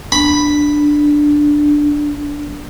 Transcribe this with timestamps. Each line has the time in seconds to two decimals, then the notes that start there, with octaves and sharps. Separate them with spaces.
0.12 D4 B5